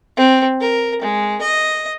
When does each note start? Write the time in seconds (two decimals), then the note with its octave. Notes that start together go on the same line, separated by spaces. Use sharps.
0.17 C4
0.61 A#4
1.02 G#3
1.42 D#5